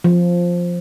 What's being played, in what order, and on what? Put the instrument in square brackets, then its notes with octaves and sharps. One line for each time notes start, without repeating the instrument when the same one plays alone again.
[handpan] F3